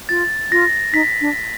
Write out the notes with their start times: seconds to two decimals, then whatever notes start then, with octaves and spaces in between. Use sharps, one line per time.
0.09 F4 A6
0.52 F4 A#6
0.93 D#4 B6
1.21 D4